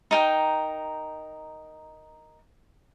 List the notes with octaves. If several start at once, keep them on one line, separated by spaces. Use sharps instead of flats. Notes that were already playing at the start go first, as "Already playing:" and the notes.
D#4 A#4 G5